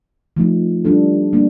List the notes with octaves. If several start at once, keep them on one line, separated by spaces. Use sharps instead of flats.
F3 A3 D#4
G3 D4 F4 A4
G3 A#3 D4